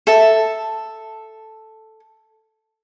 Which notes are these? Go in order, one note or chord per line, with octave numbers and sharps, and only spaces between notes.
A4 E5 A5